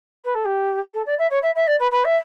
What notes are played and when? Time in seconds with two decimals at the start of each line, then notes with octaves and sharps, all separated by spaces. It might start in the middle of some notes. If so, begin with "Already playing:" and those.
0.24 B4
0.34 A4
0.45 G4
0.93 A4
1.06 D5
1.18 E5
1.30 C#5
1.42 E5
1.55 E5
1.67 D5
1.79 B4
1.91 B4
2.04 E5